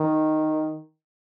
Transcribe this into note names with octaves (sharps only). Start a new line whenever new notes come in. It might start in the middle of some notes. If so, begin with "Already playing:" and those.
Already playing: D#3